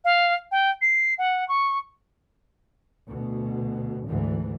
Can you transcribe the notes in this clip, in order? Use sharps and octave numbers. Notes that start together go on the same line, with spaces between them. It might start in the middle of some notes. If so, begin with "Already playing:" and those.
F5
G5
C7
F#5
C#6
D2 B2
D2 G#2 D3 E3